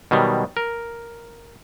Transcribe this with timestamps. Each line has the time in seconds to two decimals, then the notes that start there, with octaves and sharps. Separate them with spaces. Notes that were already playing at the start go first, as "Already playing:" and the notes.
0.11 B2 D#3 F#3 G3
0.57 A#4